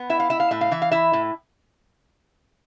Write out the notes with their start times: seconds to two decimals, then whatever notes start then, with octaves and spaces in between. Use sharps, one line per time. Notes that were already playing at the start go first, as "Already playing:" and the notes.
Already playing: B3
0.10 E4 E5
0.20 F5
0.30 E4 E5
0.40 F5
0.51 A2 E5
0.61 F5
0.71 E3 E5
0.82 F5
0.92 E4 E5
1.13 A2